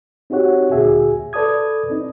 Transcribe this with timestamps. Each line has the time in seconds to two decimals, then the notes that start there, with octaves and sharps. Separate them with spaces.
0.30 C4 D#4 F#4 G4 C#5 F#5
0.71 D2 A#2 F#4 G#4 E5 G#5
1.33 A4 B4 D5 A5 D#6 G#6
1.90 C4 D#4